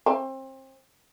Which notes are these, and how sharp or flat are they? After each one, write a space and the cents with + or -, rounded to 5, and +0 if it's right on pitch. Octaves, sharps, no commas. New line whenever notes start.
C4 +30